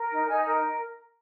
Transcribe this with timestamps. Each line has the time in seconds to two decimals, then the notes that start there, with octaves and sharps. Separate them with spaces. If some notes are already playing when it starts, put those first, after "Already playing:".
Already playing: A#4
0.11 D#4
0.28 D#4 G#5
0.45 A#4